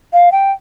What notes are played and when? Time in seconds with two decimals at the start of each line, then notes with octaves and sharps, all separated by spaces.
0.13 F5
0.32 G5